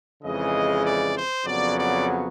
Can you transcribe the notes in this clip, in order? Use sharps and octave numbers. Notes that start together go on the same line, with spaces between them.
F2 C#3 E3 G#3 D#5
D5
C5
F2 C#3 F#3 B3 D5
D5